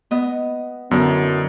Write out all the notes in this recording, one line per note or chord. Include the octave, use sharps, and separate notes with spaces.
B3 D#5
F#2 D3 B3 E4